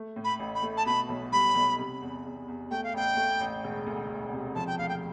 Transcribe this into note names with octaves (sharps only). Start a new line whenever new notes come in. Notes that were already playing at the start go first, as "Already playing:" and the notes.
Already playing: A3
A2
B5
A1
B5
A3
A5
B2 B5
B1
G3 B5
B1
C3
E2
E2
E2
A3 G5
F5
A1 G5
A3
A1
E1
D2
E1
C3
F3 A5
G5
D2 F5
G5